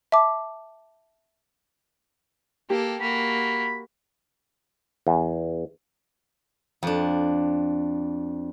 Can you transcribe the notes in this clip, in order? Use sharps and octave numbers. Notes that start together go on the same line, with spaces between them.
E5 A5 D6
A#3 G4 A4
A#3 F#4 B5
E2
F2 D4